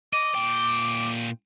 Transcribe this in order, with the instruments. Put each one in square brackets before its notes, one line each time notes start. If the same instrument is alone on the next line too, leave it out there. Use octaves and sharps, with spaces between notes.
[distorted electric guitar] D#5 [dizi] D6
[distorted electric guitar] A#2 G5